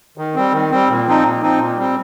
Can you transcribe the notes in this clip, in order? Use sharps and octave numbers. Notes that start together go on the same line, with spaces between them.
D#3
G3 C4
D#3
G3 C4
A#2
F3 C4 D#4
A#2
F3 C4 D#4
A#2
G3 C4